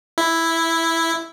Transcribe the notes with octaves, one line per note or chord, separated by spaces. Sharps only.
E4